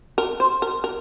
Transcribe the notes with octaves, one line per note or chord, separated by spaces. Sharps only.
A#4
C5
A#4
A#4